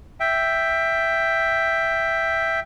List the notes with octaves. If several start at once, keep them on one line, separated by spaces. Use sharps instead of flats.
E5 G5